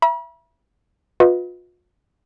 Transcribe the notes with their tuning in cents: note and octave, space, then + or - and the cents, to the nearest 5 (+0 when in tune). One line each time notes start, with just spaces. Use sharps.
E5 +20 B5 -45
F4 +40 B4 +0 D#5 +25